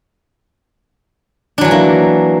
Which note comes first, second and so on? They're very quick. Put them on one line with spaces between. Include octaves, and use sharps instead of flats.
D4 F#3 E3 F#4 A#3